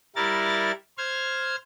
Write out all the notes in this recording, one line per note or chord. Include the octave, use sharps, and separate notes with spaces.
G3 E4 A#4 A6
C5 F6 G#6